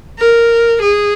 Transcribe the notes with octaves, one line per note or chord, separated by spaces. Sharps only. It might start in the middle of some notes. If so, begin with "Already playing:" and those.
A#4
G#4